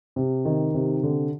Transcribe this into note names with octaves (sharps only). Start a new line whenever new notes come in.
C3
D#3
C3
D3